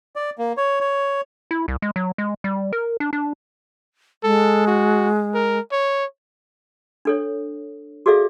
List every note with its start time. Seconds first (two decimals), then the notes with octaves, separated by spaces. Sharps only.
0.16 D5
0.38 A#3
0.57 C#5
0.81 C#5
1.51 E4
1.68 C2
1.82 G#3
1.96 F#3
2.18 G#3
2.44 G3
2.73 A#4
3.00 D4
3.13 D4
4.24 G#3 A4
4.67 F#4
5.34 A#4
5.72 C#5
7.05 D4 A4 C#5
8.06 F#4 G#4 A4 D5 E5 F5